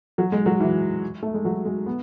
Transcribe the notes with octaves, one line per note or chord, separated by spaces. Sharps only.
F#3
G#3
F#3
E3
A3
G#3
F#3
G#3
B3